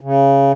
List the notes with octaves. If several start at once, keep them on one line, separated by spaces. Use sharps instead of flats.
C#3